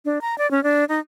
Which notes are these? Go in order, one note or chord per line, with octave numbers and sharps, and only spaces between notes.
D4
A#5
D5
C#4
D4
D#4